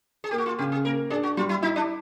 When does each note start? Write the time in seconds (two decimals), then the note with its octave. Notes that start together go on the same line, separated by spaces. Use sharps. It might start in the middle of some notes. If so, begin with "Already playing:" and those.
0.24 G#4
0.31 A#3 G4
0.38 F#4
0.46 F4
0.59 C#3 G4
0.72 G#4
0.85 A#3 A#4
1.10 D4 G#4
1.23 F#4
1.37 G3 F4
1.49 E4
1.62 D#4 E4
1.76 D4